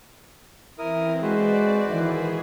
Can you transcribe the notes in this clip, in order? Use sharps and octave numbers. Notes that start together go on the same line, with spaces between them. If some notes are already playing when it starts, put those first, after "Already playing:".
E3 C4 E4 A#4 D#6
G#3 F#4 B4 C5 D5
D#3 E3 E4 G#4